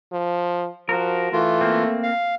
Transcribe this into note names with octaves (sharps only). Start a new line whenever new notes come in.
F3
F3 F#4 A#4
E3 A3 F4
A#3 C4
F5